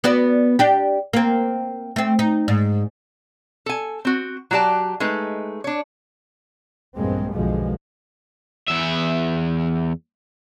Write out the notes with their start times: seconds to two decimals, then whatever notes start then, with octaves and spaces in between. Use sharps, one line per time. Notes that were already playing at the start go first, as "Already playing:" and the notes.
0.04 B3 F#4 D5
0.59 D4 G4
1.13 A#3 C4
1.96 A3 C4
2.19 D#4
2.48 G#2
3.66 A4 G#5
4.05 C4 F#4
4.51 F#3 F#4 G4 D5 A5
5.00 G#3 A3 D#4 B4
5.64 D4 C#5
6.96 A#1 E2 G2 G#3 A#3 C4
7.33 B1 F2 B2 D3 F3 G#3
8.68 E2 E5